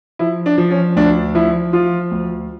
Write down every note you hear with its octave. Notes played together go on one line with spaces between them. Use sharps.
F3 E4
D4
F3
C#4
D2 D4
F3 E4
F3 F4
D2